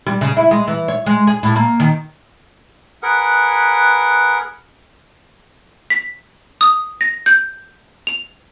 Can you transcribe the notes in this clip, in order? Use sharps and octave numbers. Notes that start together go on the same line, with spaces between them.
G3
C#3
E4
G#3
E3
C#5
G#3
G#4
A2
A#3
D#3
G#4 A#4 B4 F#5
B6
D#6
A#6
G6
F7